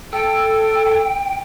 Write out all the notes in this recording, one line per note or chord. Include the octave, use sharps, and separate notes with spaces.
A4 G5